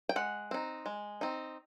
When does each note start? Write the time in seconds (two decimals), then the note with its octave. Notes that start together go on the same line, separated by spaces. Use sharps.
0.09 G5
0.16 G#3 F#5
0.51 C4 D#4
0.86 G#3
1.21 C4 D#4